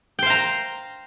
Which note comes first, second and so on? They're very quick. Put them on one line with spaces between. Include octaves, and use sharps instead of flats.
G5 C5 F5 A#5